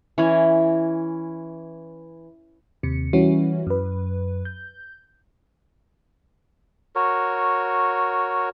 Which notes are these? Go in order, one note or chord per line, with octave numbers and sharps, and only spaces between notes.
E3 C#4
D#2 C3 C#7
E3 G3 C#4 E4 F#4
F#2 B4
G6
F#4 A#4 C#5